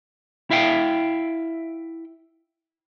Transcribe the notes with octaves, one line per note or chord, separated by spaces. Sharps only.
E4 E5 F5 G5